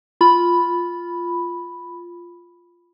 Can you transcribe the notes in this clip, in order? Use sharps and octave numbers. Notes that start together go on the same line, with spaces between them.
F4 B5